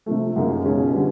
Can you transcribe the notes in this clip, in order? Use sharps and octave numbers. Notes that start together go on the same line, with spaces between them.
C3 F3 A3
F#2 C#3 F#3 A#3 D#4
B2 G#3 C#4 F4
D3 G3 B3